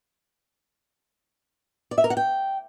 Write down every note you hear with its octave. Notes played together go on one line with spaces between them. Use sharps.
D5
E5
A#4
F#5
G5